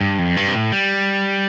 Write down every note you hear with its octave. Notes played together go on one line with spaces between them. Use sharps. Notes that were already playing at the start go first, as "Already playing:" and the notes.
G2
F2
G2
C3
A2
G3